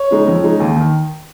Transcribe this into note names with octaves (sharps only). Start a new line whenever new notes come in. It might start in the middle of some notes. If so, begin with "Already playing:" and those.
Already playing: C#5
C#3 G#3 D#4
F2
C#3 G#3 D#4
D#2
D#3